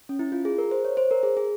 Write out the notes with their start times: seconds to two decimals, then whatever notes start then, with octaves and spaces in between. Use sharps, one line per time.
0.09 C#4
0.19 E4
0.32 F4
0.45 G#4
0.58 A#4
0.71 C5
0.85 C#5
0.97 C5
1.11 A#4
1.23 G#4
1.37 G#4